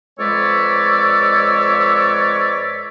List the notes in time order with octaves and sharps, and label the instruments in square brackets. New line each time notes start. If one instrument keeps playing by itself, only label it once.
[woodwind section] F2 G#3 B4 C#5 D5 E6